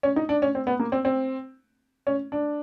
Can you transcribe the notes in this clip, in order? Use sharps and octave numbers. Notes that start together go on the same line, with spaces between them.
C#4
D#4
D4
C#4
C4
B3
A#3
C4
C4
C#4
D4